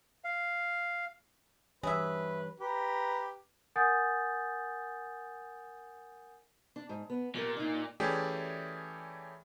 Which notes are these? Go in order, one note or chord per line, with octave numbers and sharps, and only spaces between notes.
F5
G2 E3 D4 G#4 B4 C#5 E5
G4 B4 A#5
A#4 F#5 G#5 D#6 G6 A6
D4
G#2
B3
A#2 F4 G4 A#4
D4 D#4
E3 A3 C#4 G4 G#4 D5